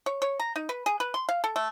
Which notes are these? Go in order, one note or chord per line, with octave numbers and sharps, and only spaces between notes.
C#5
C#5
A#5
D#4
B4
G#4
B4
C6
F5
A4
A3